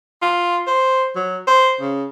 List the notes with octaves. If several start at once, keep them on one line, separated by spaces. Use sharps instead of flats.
F4
C5
F#3
C5
C#3